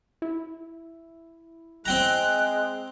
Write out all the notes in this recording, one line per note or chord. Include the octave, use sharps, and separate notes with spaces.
E4
G#3 C4 G5 A#5 F#6